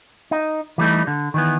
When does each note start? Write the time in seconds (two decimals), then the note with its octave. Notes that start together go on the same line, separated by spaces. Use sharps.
0.31 D#4
0.78 E3 G3 A3 D#4
1.07 D3
1.34 D#3 E3 B3